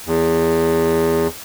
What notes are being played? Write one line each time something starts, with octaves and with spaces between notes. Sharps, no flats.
E2